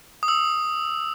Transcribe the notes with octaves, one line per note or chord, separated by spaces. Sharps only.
D#6
E6